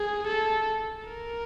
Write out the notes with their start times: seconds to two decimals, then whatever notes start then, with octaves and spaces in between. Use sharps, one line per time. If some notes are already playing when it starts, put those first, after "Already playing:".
Already playing: G#4
0.27 A4
1.08 A#4